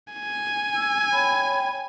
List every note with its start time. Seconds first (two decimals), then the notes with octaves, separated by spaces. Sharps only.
0.13 G#5
0.74 E6
1.13 C#5 G5 B5